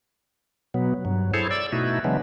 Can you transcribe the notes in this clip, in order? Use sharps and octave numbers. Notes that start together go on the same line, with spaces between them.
B2 F#3 B3
G2 F#3
E4 G#4 A4 C5 C#5
D5 E6
B2 A3 D#4 E4 F#4
C#3 E3 F#3 G#3 B3 D4